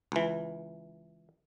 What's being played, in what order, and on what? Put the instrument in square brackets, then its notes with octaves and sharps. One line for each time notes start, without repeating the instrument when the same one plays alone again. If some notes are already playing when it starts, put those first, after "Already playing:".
[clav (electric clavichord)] C#2 E3